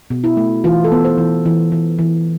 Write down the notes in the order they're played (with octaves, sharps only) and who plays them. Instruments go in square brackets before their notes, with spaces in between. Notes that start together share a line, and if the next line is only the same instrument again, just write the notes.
[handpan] B2
E4
A3
E3 F4
A4
B3
C5
E3
E3
E3
E3